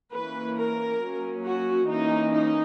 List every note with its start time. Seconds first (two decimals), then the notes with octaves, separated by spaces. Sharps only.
0.13 E3 A#3 C#4 B4
0.57 A#4
1.01 F#3 A#3 C#4
1.44 F#4
1.88 E3 A#3 C#4 D#4
2.33 D#4